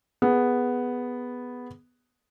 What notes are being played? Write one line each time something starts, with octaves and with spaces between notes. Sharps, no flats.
B3 G#4